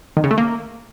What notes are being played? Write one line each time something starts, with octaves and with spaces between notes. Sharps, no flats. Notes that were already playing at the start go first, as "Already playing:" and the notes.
D#3
C#3
A3
A#3